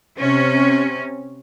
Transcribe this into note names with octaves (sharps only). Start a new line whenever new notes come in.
C3 C#4